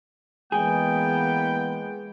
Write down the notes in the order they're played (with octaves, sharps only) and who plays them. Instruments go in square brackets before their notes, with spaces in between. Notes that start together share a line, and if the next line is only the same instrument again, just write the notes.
[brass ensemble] E3 A#3 B3 [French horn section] G#3 [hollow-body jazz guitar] G#4 [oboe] G5